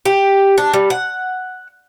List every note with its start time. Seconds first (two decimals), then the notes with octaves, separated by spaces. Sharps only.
0.05 G4
0.58 D4
0.73 G3
0.90 F#5